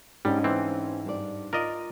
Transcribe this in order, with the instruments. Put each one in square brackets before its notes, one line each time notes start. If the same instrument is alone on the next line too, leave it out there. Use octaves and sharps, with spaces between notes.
[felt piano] G#2 [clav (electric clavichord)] G3 [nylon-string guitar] C#4 D4 D#5
[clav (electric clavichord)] E3 C4
[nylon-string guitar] G2 D5
[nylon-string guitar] F4 [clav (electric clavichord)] A#4 D5 D#5